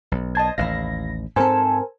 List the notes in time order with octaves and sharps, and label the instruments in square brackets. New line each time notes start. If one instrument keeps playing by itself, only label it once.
[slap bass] B1
[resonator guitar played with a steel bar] C5 D#5 [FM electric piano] A5 G#6
[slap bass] A1 D#2 [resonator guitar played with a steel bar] E4 F5 [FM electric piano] A#6
[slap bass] G#2 C4 [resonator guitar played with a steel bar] A4 A5 [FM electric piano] A#4 C5 G#5